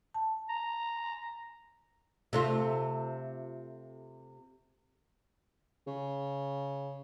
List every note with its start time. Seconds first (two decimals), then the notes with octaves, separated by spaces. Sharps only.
0.14 A5
0.49 A#5
2.33 C3 A3 F4
5.87 C#3